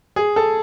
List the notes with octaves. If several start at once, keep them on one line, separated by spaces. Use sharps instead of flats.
G#4
A4